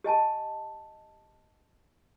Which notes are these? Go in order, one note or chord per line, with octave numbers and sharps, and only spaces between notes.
G4 D#5 G#5 A5